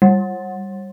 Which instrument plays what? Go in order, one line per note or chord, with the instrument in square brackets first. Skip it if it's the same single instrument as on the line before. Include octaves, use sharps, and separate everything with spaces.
[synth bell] G3